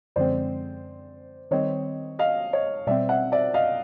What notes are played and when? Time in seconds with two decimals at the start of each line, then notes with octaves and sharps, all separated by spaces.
0.16 F#2 D3 F3 G#3 C4 C5 D5
1.51 D#3 G3 C4 C#5 D#5
2.19 D#5 F5
2.53 C#5 D#5
2.87 B2 G3 C4 D5 E5
3.09 E5 F#5
3.32 D5 E5
3.54 D#5 F5